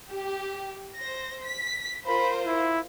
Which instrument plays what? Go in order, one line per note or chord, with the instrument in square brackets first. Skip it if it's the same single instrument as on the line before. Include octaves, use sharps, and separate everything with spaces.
[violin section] G4
C5 A#6
B6
[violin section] F4 A#4 C5 [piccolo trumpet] B5
[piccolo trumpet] E4